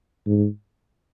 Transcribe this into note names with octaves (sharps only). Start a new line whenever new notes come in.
G#2